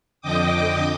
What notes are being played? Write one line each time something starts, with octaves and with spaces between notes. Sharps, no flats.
F2 D3 D#5 G5 D6 D#6